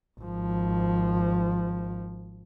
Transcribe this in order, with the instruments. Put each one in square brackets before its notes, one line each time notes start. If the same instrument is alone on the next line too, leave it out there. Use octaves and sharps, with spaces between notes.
[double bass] G#1 F3